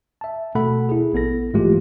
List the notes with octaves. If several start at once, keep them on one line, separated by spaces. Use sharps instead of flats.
E5 A5
B2 A3 A4 F#5 B5
E4 G#4
A#1 B3 A4 A#6
G#2 E3 G#3 A3 F4 G4